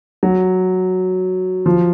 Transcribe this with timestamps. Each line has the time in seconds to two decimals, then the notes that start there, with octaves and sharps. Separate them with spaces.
0.23 F#3
1.66 F3